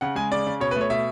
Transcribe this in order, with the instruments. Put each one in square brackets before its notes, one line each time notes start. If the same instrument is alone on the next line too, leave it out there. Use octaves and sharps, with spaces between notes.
[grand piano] C#3 F#5
G#3 G#5
C#3 D5
C#3
B2 C#5
B4
A3
C#5
B2 E5